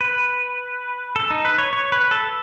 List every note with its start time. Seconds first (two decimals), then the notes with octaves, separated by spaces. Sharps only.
0.01 B4
1.16 A4
1.31 D#4
1.45 B4
1.58 C#5
1.73 C#5
1.92 B4
2.11 A4